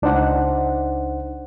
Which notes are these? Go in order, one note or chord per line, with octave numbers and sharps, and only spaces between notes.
C#2 D4 D#4 C5 F#5